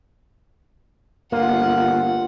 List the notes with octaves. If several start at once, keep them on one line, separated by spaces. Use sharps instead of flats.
G1 A#3 F4 F#5